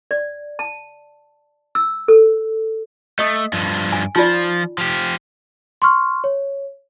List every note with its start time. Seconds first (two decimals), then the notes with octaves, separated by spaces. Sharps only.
0.11 D5
0.59 A5
1.75 E6
2.08 A4
3.19 A3 D#5 D#6
3.53 G2 F3
3.93 G#5
4.16 F3 D#4 F4 D5
4.78 F3 G4
5.82 C6 C#6 F6
6.24 C#5